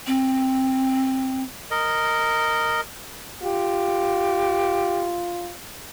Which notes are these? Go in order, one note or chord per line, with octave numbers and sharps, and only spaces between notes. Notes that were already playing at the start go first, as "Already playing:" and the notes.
C4
A#4 D#5
F4 G4